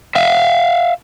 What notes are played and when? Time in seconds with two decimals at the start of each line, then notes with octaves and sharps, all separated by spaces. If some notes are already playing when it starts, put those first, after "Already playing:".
0.15 E5 F5